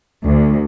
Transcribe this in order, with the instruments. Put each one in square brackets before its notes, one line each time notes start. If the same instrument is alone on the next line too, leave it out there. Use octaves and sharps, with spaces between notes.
[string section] D2